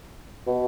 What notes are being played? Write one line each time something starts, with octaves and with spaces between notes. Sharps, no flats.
B2